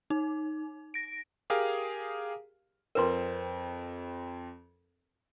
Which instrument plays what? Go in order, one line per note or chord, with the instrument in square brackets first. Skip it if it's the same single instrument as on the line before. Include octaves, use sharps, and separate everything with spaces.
[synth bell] D#4
A#6 D7
[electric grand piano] G4 G#4 A#4 F5
[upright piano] F2 C4 [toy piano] A#4 B4 C6